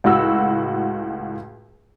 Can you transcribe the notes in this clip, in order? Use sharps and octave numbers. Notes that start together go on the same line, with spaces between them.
C#2 A2 F#4 E6